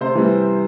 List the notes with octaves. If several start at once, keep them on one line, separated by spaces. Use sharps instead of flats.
C3 C5
E3 G3